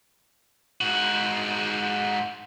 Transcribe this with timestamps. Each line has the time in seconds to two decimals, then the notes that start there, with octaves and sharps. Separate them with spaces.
0.81 G#2 F#4